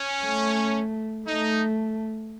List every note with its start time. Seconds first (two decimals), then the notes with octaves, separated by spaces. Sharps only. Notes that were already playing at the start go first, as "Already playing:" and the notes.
Already playing: C#4
0.24 A3
1.27 A3 D#4